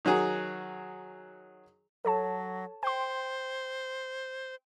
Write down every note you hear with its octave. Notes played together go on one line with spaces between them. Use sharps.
D#3 F#3 F#4 G#4
F#3 A4 C#5 A5
C5 G5 C6